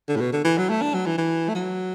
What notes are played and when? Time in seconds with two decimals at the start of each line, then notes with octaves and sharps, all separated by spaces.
0.08 D3
0.16 A2
0.20 B2
0.33 D3
0.45 E3
0.57 F#3
0.69 A3
0.81 D4
0.94 F#3
1.06 E3
1.18 E3
1.49 A3
1.55 F#3